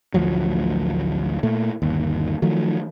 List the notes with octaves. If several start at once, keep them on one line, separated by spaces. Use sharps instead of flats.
A1 D2 F3 F#3
A#2 A3
G1 D#2
D#3 F3 F#3 A3